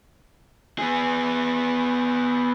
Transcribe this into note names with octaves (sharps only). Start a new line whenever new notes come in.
B3 G#4